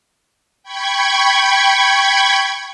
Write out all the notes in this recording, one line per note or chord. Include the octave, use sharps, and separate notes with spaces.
G5 B5 C#6 G#6